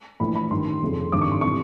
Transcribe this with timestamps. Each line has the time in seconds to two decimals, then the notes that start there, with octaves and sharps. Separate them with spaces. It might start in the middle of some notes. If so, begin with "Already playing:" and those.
0.20 A#1 A2 E3 B5
0.35 B5
0.51 A1 G2 D#3 C6
0.82 F1 F2 C#3
1.12 G#1 G2 D#3 D6
1.21 C#6
1.32 C6
1.41 C3 E3 C#6